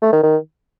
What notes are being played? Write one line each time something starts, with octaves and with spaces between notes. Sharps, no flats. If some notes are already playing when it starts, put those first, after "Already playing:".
A3
D#3
D#3